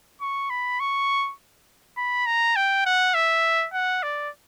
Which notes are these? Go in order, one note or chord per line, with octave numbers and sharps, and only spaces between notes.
C#6
B5
C#6
B5
A#5
G5
F#5
E5
F#5
D5